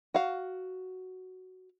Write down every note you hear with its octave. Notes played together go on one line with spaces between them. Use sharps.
F#4 F5